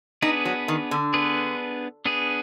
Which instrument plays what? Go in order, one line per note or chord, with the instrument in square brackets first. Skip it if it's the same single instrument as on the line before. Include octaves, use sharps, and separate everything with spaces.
[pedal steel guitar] B3 D4 G#4 B4 [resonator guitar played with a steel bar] D#4
[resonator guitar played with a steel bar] F#3
D#3
D3
[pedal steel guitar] B3 D4 G#4 B4
B3 D4 G#4 B4